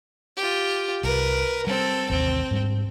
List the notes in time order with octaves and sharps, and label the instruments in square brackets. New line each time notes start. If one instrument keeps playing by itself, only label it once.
[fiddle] F4 G4
[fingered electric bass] C2 [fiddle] A#4 B4
[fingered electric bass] G3 [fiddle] C4 A4
[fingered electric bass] A1 D#2 C3 [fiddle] C4
[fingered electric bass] G#2 G3